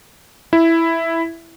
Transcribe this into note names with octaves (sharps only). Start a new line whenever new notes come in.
E4